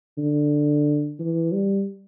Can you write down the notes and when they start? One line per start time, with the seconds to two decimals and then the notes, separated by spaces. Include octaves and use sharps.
0.18 D3
1.20 E3
1.52 G3